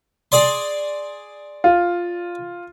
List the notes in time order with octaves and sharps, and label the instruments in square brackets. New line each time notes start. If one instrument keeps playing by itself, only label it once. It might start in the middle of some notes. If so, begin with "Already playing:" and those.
[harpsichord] G#4 D5 C6
[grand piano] F4